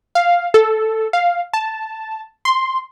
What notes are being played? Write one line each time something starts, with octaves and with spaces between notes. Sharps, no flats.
F5
A4
F5
A5
C6